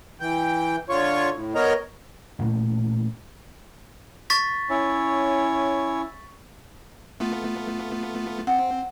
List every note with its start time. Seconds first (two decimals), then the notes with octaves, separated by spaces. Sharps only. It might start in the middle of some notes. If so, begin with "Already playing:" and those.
0.20 E3 G5
0.89 D3 F4 C#5 C#6
1.33 A2
1.55 B3 A#4 C#5 D#5 A#5
2.39 A1 A#2 A3 A#3
4.30 C#6 A6 B6
4.70 C#4 E4 C#5
7.20 A3 B3 F4
8.47 C4 F#5